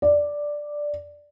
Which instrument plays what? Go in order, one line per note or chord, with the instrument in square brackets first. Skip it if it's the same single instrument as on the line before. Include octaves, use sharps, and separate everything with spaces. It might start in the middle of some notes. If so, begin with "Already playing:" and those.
[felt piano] D5